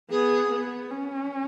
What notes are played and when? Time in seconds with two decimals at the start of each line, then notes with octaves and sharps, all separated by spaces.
0.10 B3 G#4
0.50 B3
0.91 C#4